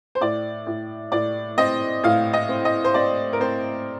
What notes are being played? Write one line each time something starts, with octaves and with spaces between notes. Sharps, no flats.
C5
A2 D5
A2
A2 D5
C4 D#5
A2 F5
D#5
C4
D#5
C5
C4 D5
A#4
C4 C5